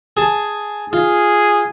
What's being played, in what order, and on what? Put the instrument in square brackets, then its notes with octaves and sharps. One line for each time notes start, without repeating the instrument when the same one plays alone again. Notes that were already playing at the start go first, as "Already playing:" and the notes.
[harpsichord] G#4 A5
[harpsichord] F4 [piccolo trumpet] G#4